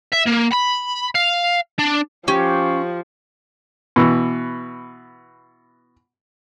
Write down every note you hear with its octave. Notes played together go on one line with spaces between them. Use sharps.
E5
A#3
B5
F5
D4
F3 C#4 G4
B2 E3